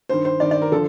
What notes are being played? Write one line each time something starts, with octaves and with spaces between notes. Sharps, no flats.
G2 D#3 C5
C5
G2 D#3 D5
D5
A#4
D3 F3 A4